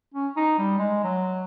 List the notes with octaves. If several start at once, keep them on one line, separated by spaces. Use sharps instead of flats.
C#4
D#4
G3
G#3
F#3